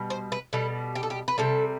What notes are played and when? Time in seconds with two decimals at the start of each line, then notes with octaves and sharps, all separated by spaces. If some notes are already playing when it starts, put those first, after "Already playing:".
Already playing: B2 G3
0.10 C5
0.32 B4
0.53 B2 G3 A4
0.95 G4
1.03 A4
1.10 G4
1.28 B4
1.38 C3 G3 A4